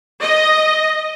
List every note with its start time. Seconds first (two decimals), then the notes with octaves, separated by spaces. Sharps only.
0.21 D#5